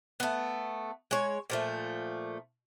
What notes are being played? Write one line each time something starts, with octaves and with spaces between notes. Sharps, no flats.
A3 B3
G#3 C#5
A#2 F3 A3